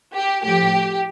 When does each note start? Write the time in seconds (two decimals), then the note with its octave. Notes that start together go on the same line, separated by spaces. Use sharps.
0.14 G4
0.43 A2 F3 G4